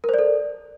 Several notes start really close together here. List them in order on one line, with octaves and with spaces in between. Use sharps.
A#4 C5 D5 A4